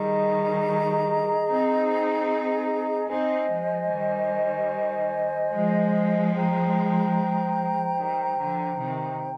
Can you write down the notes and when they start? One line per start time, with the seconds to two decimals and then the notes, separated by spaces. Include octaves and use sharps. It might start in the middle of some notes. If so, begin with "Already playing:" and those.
Already playing: D#3 G3 G#4 D#5 A#5
1.47 C4 D#4
3.10 C4 D#4 C5 D#5 G#5
3.50 F3 G#3
3.91 D#3 G3
5.54 F3 G#3
6.35 C5 G5 A#5
7.98 D#3 G3
8.38 D3 F3
8.80 C3 D#3